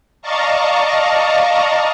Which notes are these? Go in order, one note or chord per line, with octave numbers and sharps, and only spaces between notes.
D5 D#5 F5 A5 A#5 C#6